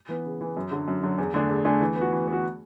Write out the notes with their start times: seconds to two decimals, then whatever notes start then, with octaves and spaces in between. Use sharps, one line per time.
0.09 E3 B3
0.25 C#3
0.41 E3 B3
0.57 F#2
0.71 D3 F#3
0.88 F#2
1.03 D3 F#3
1.18 E2
1.34 D3 A3 D4 G#4
1.49 E2
1.65 D3 A3 D4 G#4
1.81 E3
1.96 B3
2.01 F#4
2.12 E3
2.28 B3 F#4